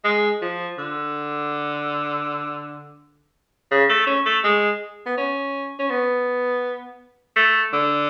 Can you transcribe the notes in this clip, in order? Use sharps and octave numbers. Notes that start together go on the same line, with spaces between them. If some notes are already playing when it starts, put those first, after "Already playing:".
G#3
F3
D3
C#3
A3
C#4
A3
G#3
B3
C#4
C#4
B3
A3
D3